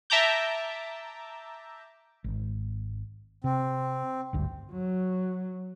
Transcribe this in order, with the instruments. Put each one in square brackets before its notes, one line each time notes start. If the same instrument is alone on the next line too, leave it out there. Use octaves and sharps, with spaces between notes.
[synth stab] E5 A5 A#5 D6 G6
[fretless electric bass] G#1
[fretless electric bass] C3 [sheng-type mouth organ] C4
[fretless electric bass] G#1 D2 G2
[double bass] F#3